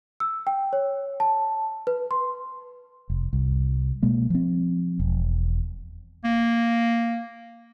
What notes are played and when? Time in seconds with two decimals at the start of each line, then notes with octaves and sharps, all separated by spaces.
0.20 E6
0.47 G5
0.73 C#5
1.20 A5
1.87 B4
2.11 C6
3.10 F1
3.33 C2
4.03 B2 G#3 A#3
4.30 F3 C4
5.00 E1
6.24 A#3